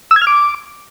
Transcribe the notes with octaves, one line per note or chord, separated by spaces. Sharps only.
E6
G#6
F6
D6